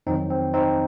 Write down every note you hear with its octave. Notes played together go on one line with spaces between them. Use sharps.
F2 D#3 F#3 C4 D#4
C4
C4 D#4